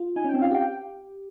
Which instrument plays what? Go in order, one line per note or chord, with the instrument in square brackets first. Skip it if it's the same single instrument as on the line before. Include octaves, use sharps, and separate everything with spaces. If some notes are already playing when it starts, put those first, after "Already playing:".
Already playing: [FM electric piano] F4
[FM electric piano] D#4 [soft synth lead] G#5
[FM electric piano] C#4
[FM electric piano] C4 [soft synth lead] G5
[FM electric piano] F4 [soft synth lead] F5
[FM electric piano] G4 [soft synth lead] G5